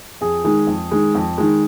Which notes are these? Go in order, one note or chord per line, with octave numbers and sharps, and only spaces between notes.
F2 G#4
D#3 G#3
F2
D#3 G#3
F2
D#3 G#3